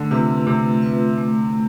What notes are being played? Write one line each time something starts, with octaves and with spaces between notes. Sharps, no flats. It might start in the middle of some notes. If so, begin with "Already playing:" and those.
Already playing: D3 A3
C3 C4 F4 B4 E5
C3 A3
C4 F4 B4 E5
A3